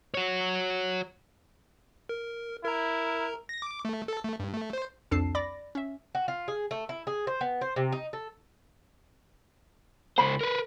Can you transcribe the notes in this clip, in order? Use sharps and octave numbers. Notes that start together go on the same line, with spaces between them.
F#4 C#5
A#4
E4 A#4 A#5
A#6
D6
A3
A4
A3
G2
A3
C5
C2 F2 D4 A4 A5 C7
D5 B5 D6 A#6
C#4 E5
F#4
F4
G#4
A3
E4
G#4
C5
B3
C5
C3
D#4
A4
C#2 C5 B5
A#4 B4